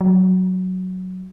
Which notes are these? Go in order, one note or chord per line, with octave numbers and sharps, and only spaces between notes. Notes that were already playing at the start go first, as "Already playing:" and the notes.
F#3